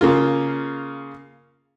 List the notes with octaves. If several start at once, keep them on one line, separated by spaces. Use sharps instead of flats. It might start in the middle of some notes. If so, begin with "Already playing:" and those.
C#3 A#3 F4